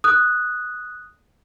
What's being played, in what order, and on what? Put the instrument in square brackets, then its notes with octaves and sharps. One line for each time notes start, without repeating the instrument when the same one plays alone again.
[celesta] D#6 F#6